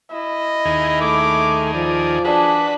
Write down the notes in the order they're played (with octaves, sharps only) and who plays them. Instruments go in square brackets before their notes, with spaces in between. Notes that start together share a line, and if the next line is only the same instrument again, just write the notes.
[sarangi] E4 [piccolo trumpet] D#5
[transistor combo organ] D#2 D#3 G#4
[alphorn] A3 [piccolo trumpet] D6
[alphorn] F3 [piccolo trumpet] D5
[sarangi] D4 [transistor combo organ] F#4 B4 [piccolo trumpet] G#4